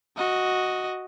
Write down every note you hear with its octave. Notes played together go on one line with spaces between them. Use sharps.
F#4 D#5